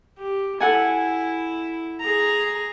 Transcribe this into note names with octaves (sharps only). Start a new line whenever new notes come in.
G4
E4 A4 F#5 G#5
G#4 A#5